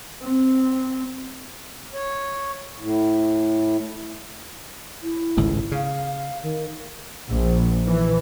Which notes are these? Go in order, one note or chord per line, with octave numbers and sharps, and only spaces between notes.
C4
C#5
A2
E4
G#1 C#2 A2
C#3 F5
D#3
A#1
E3